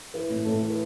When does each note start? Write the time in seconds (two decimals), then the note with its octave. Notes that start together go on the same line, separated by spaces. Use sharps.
0.14 E3 B4
0.29 A2
0.45 A2 A4
0.62 E3
0.70 B4